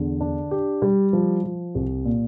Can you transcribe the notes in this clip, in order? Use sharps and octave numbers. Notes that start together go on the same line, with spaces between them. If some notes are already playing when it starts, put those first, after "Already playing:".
Already playing: E2 D3
D4
G4
G3
F3
F3
C2
A#2